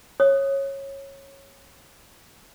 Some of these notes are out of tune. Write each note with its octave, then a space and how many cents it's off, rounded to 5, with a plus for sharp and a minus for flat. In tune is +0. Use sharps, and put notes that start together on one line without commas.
C#5 -15 D#6 +0